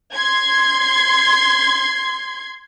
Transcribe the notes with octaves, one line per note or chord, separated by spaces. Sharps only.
C6 G#6